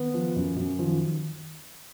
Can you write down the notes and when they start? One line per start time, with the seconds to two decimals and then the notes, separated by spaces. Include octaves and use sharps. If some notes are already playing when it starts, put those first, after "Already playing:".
Already playing: D#3 B3
0.14 F3
0.36 F#2
0.57 F#2
0.79 D#3 F3